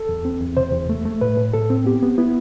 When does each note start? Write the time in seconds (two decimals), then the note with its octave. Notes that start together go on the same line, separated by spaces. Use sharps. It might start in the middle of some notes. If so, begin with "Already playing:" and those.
Already playing: A4
0.09 E2
0.25 C4
0.40 E2
0.57 C3 C5
0.72 E2
0.89 A3
1.05 A3
1.21 A2 B4
1.37 A2
1.53 A2 A4
1.70 C4
1.85 B3 G4
2.02 B3
2.18 B3 E4